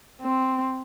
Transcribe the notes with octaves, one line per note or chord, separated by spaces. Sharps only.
C4